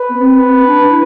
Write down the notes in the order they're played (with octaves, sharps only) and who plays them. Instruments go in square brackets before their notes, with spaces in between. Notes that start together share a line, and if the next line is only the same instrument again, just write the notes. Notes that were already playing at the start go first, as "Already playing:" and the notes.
Already playing: [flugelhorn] B4
[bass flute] B3
C4
C4
D4
E4